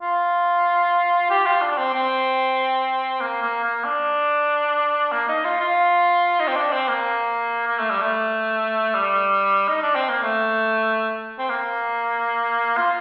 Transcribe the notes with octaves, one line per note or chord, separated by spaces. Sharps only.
F4
G4
F4
D4
D4
C4
C4
A#3
A#3
A#3
D4
A#3
D#4
F4
F4
D#4
C4
D4
C4
A#3
A#3
A3
G3
A3
G3
D#4
D4
C4
A#3
A3
C4
A#3
F4